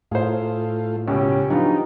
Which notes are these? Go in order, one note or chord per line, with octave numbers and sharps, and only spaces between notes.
A2 A3 F4 G#4 C5
C#2 B2 C#4 G4
F3 F#3 B3 D4 D#4 F4 G4